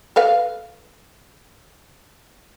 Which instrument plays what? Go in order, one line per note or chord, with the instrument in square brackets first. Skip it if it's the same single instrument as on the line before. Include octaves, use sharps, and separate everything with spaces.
[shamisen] A4 B4 F5